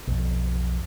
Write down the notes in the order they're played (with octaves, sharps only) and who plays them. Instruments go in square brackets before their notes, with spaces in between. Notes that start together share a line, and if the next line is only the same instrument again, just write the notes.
[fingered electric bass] B1 F2